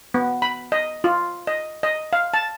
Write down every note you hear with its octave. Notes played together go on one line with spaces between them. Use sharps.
B3
B5
D#5
F4
D#5
D#5
F5
A5